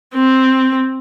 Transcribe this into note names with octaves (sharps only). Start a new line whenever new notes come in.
C4